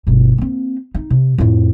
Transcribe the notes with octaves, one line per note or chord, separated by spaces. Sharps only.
G1 B2
A#3 C4
D#4
C3
F2 A2